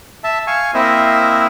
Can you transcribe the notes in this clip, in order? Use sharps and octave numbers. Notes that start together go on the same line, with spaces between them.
E5 A5
F5 G#5 C#6
A#3 C4 E4 C5 D#5 E5